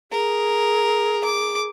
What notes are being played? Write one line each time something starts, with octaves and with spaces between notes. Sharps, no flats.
G#4 A#4
D6